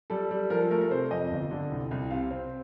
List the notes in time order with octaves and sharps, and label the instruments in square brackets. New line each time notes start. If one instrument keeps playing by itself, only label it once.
[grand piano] G3 A4
G3
F3 A#4
A4
A3 A#4
A#4
C3 C5
F2 D#5
G1
D3
C2
C2
C3 F5
C4